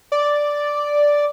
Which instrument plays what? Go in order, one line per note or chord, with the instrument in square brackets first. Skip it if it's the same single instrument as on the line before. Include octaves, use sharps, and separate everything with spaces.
[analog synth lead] D5